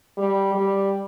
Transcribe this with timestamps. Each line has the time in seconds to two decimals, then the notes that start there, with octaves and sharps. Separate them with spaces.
0.18 G3
0.55 G3